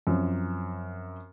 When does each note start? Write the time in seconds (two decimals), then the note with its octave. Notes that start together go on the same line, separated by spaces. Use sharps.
0.07 F#2 F3 C4